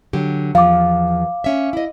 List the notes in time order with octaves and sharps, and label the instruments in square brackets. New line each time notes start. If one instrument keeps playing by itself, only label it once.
[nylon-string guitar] D3 F#3 G4
[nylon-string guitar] E2 F3 [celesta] F5 D6
[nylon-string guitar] C#4 E5
E4 D#5